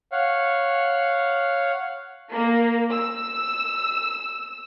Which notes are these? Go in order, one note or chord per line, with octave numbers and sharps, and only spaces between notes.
C#5 F5 F#5
A#3
E6